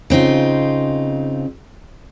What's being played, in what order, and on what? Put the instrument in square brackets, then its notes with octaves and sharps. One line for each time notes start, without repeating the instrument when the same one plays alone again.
[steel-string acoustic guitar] C#3 C4 D#4 F4